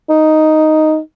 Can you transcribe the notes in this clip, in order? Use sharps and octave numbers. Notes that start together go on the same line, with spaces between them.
D#4